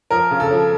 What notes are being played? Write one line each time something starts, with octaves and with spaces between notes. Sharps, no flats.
F3 A#4
C#3
A4
F3